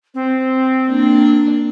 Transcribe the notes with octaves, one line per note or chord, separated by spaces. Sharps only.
C4
A#3 D4